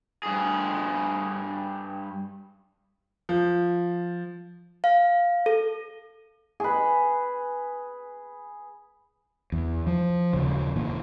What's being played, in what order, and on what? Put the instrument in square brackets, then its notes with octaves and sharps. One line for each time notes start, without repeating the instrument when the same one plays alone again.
[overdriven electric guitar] G2 G#4
[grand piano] F3
[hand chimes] F5
A4
[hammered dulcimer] G#4 B4
[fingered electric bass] E2
F3
D#1 C#3
A#2 E3